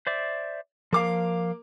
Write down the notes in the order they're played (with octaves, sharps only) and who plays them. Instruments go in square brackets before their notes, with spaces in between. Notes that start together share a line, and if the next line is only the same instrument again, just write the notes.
[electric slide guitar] C5 D5 E5
[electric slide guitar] F3 F5 [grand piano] A#3 D6